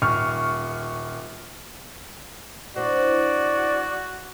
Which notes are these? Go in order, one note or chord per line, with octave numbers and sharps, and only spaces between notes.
D#1 C#6 F6
D4 E4 F#4 C5 D5